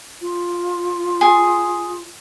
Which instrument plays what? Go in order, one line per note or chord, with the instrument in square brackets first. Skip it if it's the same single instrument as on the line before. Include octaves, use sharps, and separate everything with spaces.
[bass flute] F4
[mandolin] G#4